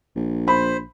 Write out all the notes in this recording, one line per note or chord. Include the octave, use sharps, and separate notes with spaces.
A#1
C5 B5